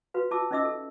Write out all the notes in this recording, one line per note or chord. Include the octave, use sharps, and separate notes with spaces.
F#4 B4 F5
F4 E5 A5 D6 E6
C#4 D#4 D#5 E5 D6 E6
A4